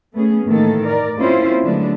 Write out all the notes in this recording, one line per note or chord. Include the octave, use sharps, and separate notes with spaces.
A3 B3 C#4 G#4
A2 D#3 E3 A#3 A4
A#4 D5
A#3 C4 C#4 E4 F4 C5
D3 F#3 G#3 A3 B3 D4